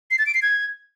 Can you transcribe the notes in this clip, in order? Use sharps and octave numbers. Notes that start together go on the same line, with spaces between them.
C7
A6
D7
C7
G#6